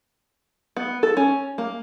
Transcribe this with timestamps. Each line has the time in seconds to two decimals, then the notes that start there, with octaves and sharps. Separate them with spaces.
0.76 B3
1.03 A4
1.17 C#4
1.58 A#3